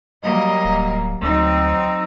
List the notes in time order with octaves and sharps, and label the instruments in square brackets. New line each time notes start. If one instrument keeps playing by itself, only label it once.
[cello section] F#3 G3 A#3 [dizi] D#5
[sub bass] D1
[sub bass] D2 [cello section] F#3 C4 D#4 [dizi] E6